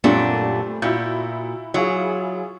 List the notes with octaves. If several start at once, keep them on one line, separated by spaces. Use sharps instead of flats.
F#2 A#2 G3 A3 C4 D4
A#2 E4 F#4 G6
F#3 E4 F4 G#4